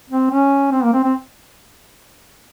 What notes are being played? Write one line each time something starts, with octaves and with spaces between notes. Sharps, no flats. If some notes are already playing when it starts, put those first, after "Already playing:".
C4
C#4
C4
A#3
C4
C4